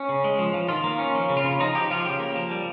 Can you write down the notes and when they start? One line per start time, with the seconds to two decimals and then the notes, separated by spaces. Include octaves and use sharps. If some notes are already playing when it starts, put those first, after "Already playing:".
Already playing: C#4
0.09 C#3
0.24 G#3
0.39 F3
0.54 F3
0.68 D#3 F4
0.84 A#3
0.99 C#4
1.15 F3
1.29 C#3
1.37 F4
1.44 C#3
1.60 F3 D#4
1.75 F3 G4
1.91 F3 F4
2.05 C#3 G4
2.20 A#3
2.36 F3
2.51 G3